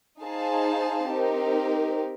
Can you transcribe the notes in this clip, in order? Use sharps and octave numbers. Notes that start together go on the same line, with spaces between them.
D#4 G#4 C5 F5 A5
C4 D#4 G4 A#4